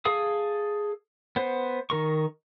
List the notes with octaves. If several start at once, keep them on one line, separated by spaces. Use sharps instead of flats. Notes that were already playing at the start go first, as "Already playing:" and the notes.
G#4 A4 F5 D#6
B3 C5
D#3 A#4 C#6